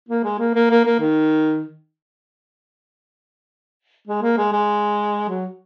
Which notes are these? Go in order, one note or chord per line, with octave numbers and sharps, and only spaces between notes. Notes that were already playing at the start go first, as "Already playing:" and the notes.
A#3
G#3
A#3
A#3
A#3
A#3
D#3
G#3
A#3
G#3
G#3
F#3